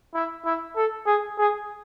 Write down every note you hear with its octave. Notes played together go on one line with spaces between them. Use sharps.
E4
E4
A4
G#4
G#4